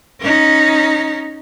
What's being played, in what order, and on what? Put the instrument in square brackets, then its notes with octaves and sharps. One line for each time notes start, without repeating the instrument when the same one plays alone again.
[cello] C#4 D#4